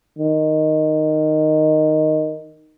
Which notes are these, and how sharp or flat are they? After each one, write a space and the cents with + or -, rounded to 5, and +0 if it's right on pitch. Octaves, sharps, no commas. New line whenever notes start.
D#3 -5